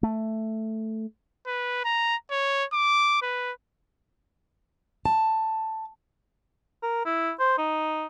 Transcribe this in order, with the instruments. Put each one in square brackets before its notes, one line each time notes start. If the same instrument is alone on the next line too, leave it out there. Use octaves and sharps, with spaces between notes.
[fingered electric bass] A3
[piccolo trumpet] B4
A#5
C#5
D6
B4
[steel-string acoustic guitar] A5
[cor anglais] A#4
E4
C5
D#4